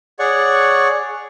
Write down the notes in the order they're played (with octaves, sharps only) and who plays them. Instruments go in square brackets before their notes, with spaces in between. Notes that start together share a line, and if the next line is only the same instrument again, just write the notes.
[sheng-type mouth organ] G#4 C#5 D5 F#5 C#6